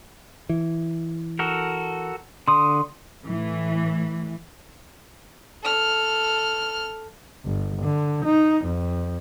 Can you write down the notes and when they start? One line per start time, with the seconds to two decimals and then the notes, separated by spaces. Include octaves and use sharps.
0.49 E3
1.39 F#4 A4 A#4
2.48 D3 C6 D#6
3.27 A2 E3
5.63 A4 F6
7.45 G1
7.82 D3
8.25 D#4
8.65 F2